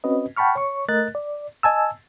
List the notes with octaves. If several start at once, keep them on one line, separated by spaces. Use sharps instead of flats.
C4 C#4 F#4 B4 D#5
F#5 G5 A5 B5 C#6 F6
C#5 C#6
A3 A#4 D#5 F#6 A6
D5
D#5 G#5 A5 E6